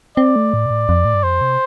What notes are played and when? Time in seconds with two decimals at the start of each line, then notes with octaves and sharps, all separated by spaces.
0.17 C4 D5
0.36 A3
0.54 A2
0.66 C3
0.71 A2
0.89 F2
1.05 A2
1.14 G2
1.23 F2 C5
1.41 C3